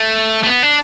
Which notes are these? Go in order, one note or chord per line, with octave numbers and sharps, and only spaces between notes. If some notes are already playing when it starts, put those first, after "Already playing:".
Already playing: A3
A3
B3
D4